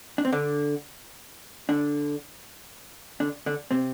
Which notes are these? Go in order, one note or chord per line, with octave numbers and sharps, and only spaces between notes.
D4
C4
D3 D4
D3 D4
D3 D4
D3 D4
C3 C4